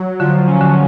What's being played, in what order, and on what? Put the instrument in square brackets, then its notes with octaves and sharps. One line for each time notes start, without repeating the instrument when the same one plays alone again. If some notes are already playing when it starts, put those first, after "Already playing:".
Already playing: [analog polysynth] F#3
[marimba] D3 [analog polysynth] F3
[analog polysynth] C#4
[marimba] D3